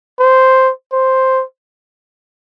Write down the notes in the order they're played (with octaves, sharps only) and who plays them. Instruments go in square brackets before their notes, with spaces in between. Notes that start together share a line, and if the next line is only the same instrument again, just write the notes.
[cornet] C5
C5